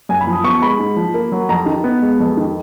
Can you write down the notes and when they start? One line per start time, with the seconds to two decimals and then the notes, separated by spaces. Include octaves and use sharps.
0.09 F#2 G#5
0.21 B5
0.27 F3
0.33 D#6
0.44 B3 C#6
0.62 G#3 B5
0.79 G#2
0.97 F3
1.14 A#3
1.32 F#3
1.49 F2 A#5
1.66 D#3
1.84 B3
2.02 G#3
2.20 F2
2.37 D#3